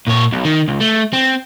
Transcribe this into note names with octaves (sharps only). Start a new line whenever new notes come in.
A#2 C#5
B1
D#3
C#2
A3
C4